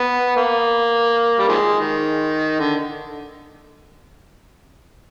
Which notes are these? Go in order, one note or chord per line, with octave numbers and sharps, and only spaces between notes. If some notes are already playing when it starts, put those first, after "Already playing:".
Already playing: B3
A#3
G3
D#3 F3 G#3
D#3
D3